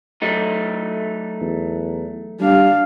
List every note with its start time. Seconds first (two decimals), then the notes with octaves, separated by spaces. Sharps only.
0.22 F#3 A3 D#4
1.41 E2
2.40 G3 D4 F5